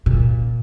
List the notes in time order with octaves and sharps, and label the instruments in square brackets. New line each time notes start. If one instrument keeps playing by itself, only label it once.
[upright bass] A#2